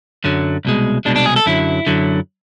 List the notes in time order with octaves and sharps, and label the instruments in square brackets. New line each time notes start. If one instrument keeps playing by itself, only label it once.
[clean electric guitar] F#2 D3 F#3
C2 B2 G#3
C2 B2 G#3 D4
D4
G#4
A4
F#2 D3 F#3 E4
F#2 D3 F#3